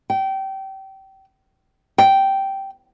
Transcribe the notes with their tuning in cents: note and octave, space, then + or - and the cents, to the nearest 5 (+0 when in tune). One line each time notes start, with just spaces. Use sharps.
G5 -25
G5 -10